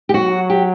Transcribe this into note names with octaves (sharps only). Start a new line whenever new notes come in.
G4
F#3 F#4
G4